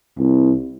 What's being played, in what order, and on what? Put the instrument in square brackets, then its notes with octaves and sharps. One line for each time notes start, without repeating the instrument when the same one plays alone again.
[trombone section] C2